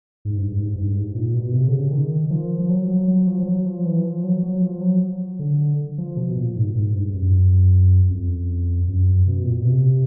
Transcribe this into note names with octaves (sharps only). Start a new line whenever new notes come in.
G#2
G2
G2
G#2
G2
G#2
A#2
B2
C3
D3
C#3
D#3
F3
F3
F#3
F#3
F#3
F3
F3
F#3
F3
E3
F3
F#3
F#3
F3
F#3
D3
F3
B2
A#2
G#2
G#2
G2
F#2
F2
F#2
B2
A#2
B2
C3